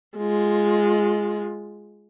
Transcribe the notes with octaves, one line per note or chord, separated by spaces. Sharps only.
G#3 F4